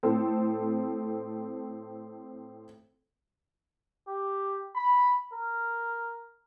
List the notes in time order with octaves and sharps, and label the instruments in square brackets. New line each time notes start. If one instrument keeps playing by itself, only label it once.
[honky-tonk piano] A2 C4 A4
[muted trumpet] G4
B5
A#4